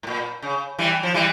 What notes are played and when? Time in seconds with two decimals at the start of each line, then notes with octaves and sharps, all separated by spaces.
0.03 A2
0.07 A#2
0.42 C#3
0.79 E3 G3
1.03 F3
1.14 E3 G3